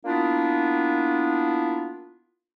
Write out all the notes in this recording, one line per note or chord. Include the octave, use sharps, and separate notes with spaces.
A#3 B3 D4 E4 F4